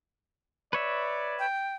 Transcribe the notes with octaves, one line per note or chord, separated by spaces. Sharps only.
B4 C#5 D5 E5
G5